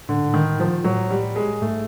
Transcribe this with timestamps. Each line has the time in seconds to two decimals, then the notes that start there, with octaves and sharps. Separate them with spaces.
0.09 A2 D3
0.19 G#2
0.28 A2
0.34 D#3
0.60 F3
0.84 A2 F#3
1.11 G3
1.36 G#3
1.62 G#2 A3